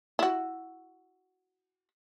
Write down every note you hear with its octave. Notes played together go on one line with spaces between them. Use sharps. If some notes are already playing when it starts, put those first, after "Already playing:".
E4 F#4